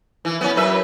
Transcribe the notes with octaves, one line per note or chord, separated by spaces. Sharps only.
E3
B3 C#4
F#2 B4 E5